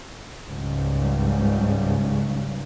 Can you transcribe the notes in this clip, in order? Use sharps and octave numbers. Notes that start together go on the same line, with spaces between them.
C#2 G#2 C#3 G3